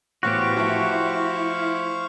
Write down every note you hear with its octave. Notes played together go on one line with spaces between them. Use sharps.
A2 E3 B3 F#4 G4 C5 F5 C#6
F3 A3 E4 E5